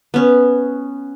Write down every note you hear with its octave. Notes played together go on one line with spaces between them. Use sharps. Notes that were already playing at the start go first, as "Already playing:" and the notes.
B3 C#4